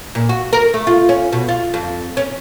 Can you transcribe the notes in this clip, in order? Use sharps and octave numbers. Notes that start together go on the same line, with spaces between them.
A#2
F#4
A#4
A3
F4
C#4
B2
F4
F2
C#4